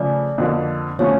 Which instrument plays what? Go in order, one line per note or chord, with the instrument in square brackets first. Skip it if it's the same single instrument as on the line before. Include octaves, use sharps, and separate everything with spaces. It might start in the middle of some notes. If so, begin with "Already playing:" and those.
Already playing: [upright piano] C#3 F3 A3 [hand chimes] D5
[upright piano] F2 D3 F3 A#3
[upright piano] D3 F3 A3 C#4 [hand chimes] C#5